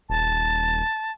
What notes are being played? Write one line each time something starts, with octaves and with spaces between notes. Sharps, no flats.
D#1 A5